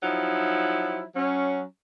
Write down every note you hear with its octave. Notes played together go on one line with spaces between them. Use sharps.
F3 F#3 D#4 E4
F#3 C#4